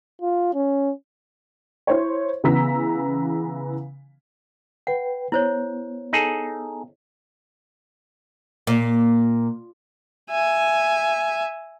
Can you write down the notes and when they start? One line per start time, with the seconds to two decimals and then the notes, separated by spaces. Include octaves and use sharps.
0.22 F4
0.54 C#4
1.87 E4 C5 C#5
2.44 C#3 E3 B3 A#5 E6 B6
4.87 B4 F#5 G5
5.32 B3 E4 C5 C#5
6.13 D#4 G#4 A4
8.67 A#2
10.30 E5 G#5